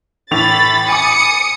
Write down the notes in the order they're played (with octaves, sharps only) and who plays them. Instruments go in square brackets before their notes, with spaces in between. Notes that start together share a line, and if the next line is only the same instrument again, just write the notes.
[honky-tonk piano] A2 E3 F7 [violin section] B5 A6
[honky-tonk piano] G#5 B5 D6 [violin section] D#6 C#7